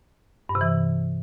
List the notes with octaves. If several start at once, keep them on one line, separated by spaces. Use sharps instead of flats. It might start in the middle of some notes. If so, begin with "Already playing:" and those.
G2
C3
E3